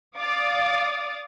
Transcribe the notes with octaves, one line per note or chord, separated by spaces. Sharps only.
D5 F5 D6 D#6 A6